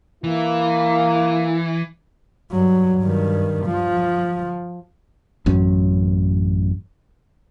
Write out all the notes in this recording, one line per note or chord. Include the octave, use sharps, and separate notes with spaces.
E3 A#3 E4
G2 F#3
G2 D#3
F3
A1 F#2 F#3 C#4